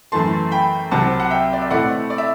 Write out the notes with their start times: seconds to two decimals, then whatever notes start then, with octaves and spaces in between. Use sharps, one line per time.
0.12 F#2 E3 A3 A5 C6
0.51 G5 B5
0.91 C2 C3 F#3 C4 F#5 A5
1.20 F#5
1.30 E5 G5
1.53 D5
1.62 E5
1.71 B2 A3 C4 E4 D5 F#5
2.10 D5
2.18 E5